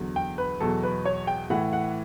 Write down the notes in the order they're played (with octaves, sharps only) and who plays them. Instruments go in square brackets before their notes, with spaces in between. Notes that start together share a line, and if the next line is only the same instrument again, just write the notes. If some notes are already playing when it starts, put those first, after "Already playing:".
Already playing: [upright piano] E2 D3 F#3
G5
B4
E2 B2 F#3 A4
B4
C#5
G5
A2 E3 F#5
F#5